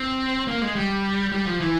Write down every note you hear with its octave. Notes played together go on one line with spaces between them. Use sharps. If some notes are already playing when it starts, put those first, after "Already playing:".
Already playing: C4
A#3
G#3
G3
G3
F3
E3